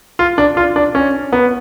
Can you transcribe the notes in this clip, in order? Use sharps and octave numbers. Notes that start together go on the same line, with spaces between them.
F4
D4
F4
D4
C#4
B3